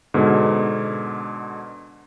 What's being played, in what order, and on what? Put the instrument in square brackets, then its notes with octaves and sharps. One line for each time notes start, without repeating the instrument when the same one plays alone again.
[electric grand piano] G#2 B2 D3